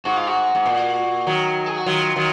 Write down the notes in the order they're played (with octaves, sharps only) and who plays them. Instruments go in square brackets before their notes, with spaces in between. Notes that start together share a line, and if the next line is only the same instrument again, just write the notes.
[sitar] G#2 [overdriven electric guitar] F#4
[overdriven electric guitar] F4
F#4
[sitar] G#2
A#2
D#3 F#3
[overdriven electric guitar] G#4
F#4
[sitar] D#3 F#3 [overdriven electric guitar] F4
[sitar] D#3 F#3